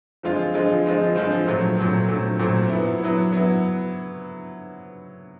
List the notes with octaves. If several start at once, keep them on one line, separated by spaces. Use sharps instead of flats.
D3 F3 G#3 C4 F4
D3 F3 G#3 C4 F4
D3 F3 G#3 C4 F4
D3 F3 G#3 C4 F4
A#2 F#3 A3 C4
A#2 F#3 A3 C4
A#2 F#3 A3 C4
A#2 F#3 A3 C4
F#3 B3 E4
F#3 B3 E4
F#3 B3 E4